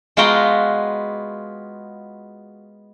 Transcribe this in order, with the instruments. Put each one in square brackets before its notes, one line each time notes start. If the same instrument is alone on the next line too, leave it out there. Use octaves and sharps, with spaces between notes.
[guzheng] G#3 B3 F4 F#4 G5 A#5